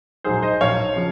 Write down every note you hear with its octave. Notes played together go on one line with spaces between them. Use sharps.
A#1 G#2 F#3 G#4 C5
C5 D#5
A#1 G#2 F#3 C#5 F5
C#3 F3